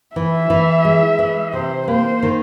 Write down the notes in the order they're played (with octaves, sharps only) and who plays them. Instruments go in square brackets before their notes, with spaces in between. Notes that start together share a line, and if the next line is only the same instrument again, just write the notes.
[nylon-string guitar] E3 [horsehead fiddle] E5
[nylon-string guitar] E3
G#3
E3
[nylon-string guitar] C3 [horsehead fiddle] C5
[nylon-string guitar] A#3 [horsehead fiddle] C5
[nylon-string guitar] D#3